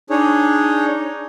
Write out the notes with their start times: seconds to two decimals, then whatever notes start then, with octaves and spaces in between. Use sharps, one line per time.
0.10 D4 D#4 G#4 C#5